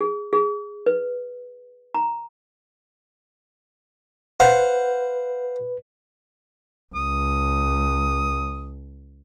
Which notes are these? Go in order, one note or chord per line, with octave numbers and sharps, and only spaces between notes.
G#4
G#4
B4
A#5
B4 C5 F5 F#5
C#2 D#6